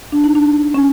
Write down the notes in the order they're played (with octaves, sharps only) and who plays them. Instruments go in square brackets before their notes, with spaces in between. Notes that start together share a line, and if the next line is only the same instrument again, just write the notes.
[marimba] D4
D#4
D4
C#4